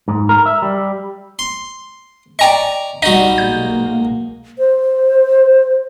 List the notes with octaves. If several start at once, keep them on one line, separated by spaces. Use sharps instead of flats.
G#2
A#4
E5
G3
C6
D5 D#5 G5 A#5 C#6
B1 G3 D#4 F#4 D#5
B1 G#3 A#3 G6
C5